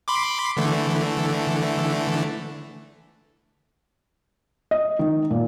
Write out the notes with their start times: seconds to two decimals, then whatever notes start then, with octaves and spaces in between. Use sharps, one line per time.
0.08 B5 C6 D6
0.57 D3 E3 A3
4.71 D#5
4.99 D#3
5.31 A#2